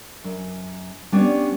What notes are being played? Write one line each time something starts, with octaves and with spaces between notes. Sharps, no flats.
F#2
G3 B3 C#4 D4